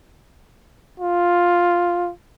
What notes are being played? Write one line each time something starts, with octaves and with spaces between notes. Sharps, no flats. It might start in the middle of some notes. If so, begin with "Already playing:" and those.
F4